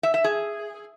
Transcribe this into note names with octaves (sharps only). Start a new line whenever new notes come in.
E5
E5
G#4